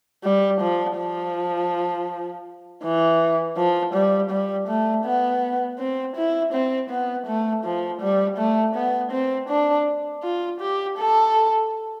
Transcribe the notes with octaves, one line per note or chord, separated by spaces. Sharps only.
G3
F3
F3
E3
F3
G3
G3
A3
B3
C4
E4
C4
B3
A3
F3
G3
A3
B3
C4
D4
F4
G4
A4